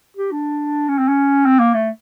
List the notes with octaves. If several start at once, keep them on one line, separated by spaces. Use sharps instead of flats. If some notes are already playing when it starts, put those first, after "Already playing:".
G4
D4
C#4
C4
C#4
C4
A#3
A3